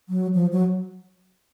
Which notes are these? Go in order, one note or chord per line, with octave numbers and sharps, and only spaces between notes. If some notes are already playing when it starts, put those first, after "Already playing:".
F#3
F3
F#3